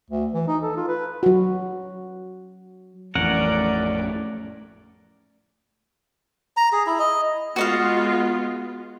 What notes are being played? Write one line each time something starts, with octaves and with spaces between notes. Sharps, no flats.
D2
E3
D#4
A4
F4
B4
F#3 F#4
A1 F2 E3 A3 C#4 A#4 D5 F#5
A#5
G#4
E4
D#5
G#3 B3 F4 F#4 D#5 F5